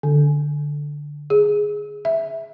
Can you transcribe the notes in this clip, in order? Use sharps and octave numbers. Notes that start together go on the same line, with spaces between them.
D3
G#4
E5